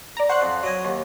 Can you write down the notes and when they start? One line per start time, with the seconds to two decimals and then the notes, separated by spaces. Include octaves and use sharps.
0.17 D5 A#5
0.29 C5 F#5 C#6 F#6
0.42 F2
0.63 F#3 D#5 G#5
0.85 D#2